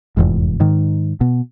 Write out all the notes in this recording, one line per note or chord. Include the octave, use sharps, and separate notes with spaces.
F1 E2 G#2
G#2 D#3
B2